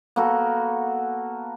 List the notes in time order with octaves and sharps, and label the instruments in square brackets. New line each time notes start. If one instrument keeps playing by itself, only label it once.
[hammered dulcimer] A#3 B3 F#4 A4